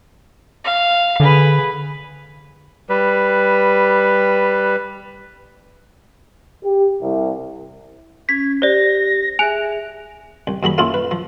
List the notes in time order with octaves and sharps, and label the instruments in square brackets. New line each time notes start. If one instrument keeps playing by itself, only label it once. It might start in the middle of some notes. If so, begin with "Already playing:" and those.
[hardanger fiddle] F5
[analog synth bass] D3 [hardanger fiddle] G#4 B4
[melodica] G3 B4
[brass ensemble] G4
C2
[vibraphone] C#4 [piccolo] G#6 [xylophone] B6
[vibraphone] G4 [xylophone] C5 D5 [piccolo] A#6
[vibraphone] G#4 E5 [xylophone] G#5 D7 F7 [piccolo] F#6
[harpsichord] C2
D#2 F#3 G#4 B5
A3 A#3 C#4 E4 F4
B4
F3